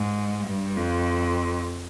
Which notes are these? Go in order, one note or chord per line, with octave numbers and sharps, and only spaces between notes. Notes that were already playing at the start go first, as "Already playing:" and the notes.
Already playing: G#2
G2
F2